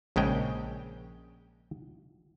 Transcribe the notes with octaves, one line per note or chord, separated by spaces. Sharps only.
A#1 C#3 G#3 G5